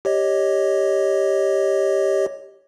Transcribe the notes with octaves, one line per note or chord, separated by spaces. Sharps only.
G4 C#5 D#5